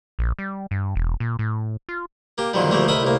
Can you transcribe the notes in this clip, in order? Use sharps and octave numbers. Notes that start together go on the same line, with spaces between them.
A#1
G3
G2
E1
A#2
A2
F4
A#3 G4
F#2 A#2 D3 D#3 F3 G3
D2 F3 G3 A3 A#3
C2 A2 A#4 D#5 E5 B5
C2 A2 A#3